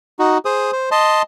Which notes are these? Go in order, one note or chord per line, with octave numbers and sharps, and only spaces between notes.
D#4 F#4
G#4 C5 D#6
C5
D#5 A5 C6